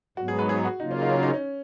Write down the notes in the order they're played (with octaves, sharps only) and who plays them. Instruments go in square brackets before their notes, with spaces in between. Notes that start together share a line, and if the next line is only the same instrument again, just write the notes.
[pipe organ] G#2 F#3 B3 [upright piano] F#4
[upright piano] G#4
B4
G#4
F#4
[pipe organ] C#3 F#3 A#3 F4 [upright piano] D#4
[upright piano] C#4
D#4
C#4
D#4
C#4